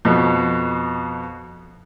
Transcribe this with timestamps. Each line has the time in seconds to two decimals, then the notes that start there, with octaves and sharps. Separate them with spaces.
0.05 F2 B2